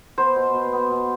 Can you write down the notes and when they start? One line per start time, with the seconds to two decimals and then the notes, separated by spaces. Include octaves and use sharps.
0.18 B3 C5
0.36 B2
0.54 B2
0.73 B3
0.91 B2